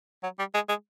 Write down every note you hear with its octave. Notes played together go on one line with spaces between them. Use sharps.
F#3
G3
G#3
G#3